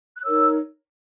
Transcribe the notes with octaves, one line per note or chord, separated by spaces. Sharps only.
F#6
D#4 A#4 C#5 E6